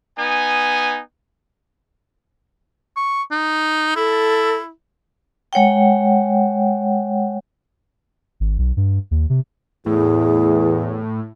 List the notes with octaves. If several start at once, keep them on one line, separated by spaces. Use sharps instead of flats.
B3 D#4 G#5
C#6
D#4
E4 A4
G#3 C#5 F#5 G5
G#1
B1
G2
D#2
C3
E2 A2 E3 G#4